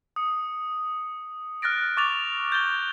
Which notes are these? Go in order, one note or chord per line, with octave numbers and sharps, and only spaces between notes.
D#6 C#7
F6 F#6 A6 A#6 D7
C#6 D6 A6 F7
G6 A6 G7